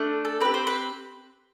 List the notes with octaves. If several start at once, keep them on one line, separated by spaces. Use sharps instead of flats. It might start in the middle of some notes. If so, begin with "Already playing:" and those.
Already playing: A3 D4
A4
C4 G4 B4
C5
B4